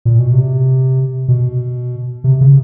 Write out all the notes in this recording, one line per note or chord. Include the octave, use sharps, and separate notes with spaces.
A#2
B2
C3
B2
C3
C#3